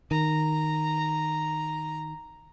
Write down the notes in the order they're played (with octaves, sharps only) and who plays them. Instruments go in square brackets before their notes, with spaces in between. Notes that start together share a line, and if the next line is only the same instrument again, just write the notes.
[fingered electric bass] D#3 [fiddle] A#5